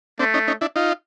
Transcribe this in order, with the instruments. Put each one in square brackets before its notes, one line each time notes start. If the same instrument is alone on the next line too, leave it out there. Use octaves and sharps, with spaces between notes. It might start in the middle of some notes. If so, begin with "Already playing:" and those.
[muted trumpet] A3 [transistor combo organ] C4 D4
[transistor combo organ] C#4 D#4
C#4 D#4
D4 E4
D#4 F4